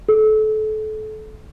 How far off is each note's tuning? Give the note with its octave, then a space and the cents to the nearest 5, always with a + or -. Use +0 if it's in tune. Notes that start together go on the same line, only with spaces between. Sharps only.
A4 -30